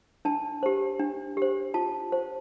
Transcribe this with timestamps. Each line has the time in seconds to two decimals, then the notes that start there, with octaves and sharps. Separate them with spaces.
0.25 D4 A5
0.63 G4 C5
0.99 D4
1.37 G4 C5
1.74 F4 A5
2.12 C5